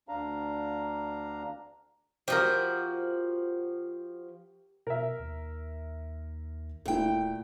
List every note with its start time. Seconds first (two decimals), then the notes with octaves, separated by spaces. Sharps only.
0.09 D2 D4 F5 A#5
2.28 F3 F#4 G4 A#4
4.87 B2 A#4 E5
5.20 D#2
6.85 D1 A#2 A3 E4 G5